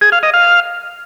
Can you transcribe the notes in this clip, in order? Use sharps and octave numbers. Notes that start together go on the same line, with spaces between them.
G#4
F5
D#5
F5